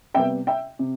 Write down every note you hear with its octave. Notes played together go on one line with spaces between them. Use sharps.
C3 G3 B3 E5 G5
E5 G5
C3